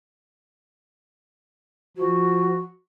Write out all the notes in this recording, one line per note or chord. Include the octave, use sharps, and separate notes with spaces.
F3 F#4